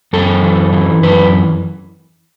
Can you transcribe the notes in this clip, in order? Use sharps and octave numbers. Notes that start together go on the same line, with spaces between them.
F#2 A4
E3
E3
F#2 B4